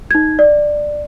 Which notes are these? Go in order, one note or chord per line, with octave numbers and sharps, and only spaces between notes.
D#4 G#6
D5